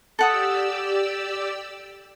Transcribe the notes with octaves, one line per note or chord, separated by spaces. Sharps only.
G4 A4 D5 F#5 D#6 E6